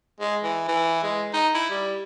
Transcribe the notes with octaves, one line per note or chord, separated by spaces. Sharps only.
G#3
E3
E3
G#3
D#4
E4
G3